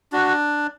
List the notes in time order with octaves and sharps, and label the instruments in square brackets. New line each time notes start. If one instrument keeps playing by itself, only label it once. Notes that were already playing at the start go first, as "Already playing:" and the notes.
[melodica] D4 F#4